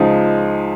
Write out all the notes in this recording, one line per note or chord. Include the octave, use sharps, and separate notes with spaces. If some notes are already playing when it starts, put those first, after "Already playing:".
Already playing: C#2 C#3 F3 G#3 D#4